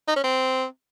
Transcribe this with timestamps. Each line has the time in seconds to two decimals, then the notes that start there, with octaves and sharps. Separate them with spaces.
0.08 D#4
0.16 C#4
0.24 C4